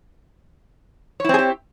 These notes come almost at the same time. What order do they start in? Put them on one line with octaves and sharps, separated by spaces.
C#5 E4 C4 G#4 G4